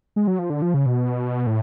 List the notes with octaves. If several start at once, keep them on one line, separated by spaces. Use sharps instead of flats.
G#3
F#3
F3
D3
F3
C#3
B2
A2